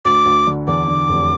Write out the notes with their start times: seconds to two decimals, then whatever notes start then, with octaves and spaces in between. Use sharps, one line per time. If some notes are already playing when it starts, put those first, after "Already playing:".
0.05 D2 D6
0.26 D2
0.47 D3
0.67 E2 D6
0.88 D3
1.09 F1